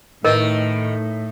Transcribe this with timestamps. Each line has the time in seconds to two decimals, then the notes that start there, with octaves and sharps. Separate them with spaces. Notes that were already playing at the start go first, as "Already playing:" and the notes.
0.25 A2 D#3 A#4 B4 D#5